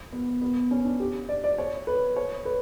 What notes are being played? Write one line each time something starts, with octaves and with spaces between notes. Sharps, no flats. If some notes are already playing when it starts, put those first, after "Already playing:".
B3
B3
C#4
D4
G4
D5
D5
C#5
B4
C#5
B4